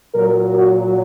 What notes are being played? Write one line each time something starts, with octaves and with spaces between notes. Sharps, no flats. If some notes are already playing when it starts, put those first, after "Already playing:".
A#2 F#3 A#4
F#4